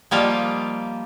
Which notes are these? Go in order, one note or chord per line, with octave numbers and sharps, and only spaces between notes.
F3 G3 A#3 F4 D#5